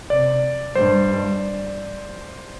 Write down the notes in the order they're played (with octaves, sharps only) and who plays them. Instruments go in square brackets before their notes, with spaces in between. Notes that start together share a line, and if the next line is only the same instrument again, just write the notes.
[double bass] C3 [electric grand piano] D5
[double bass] G2 [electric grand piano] C5